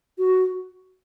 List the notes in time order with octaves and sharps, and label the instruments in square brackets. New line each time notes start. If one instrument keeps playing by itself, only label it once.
[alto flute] F#4